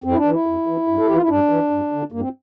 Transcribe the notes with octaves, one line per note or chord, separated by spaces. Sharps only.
F2 C4
E4
D4
E3
E4
F2
E3
G2
A4
E3 G4
F4
E4
G2 D4
E3
G2
D3
G2 A#3
C4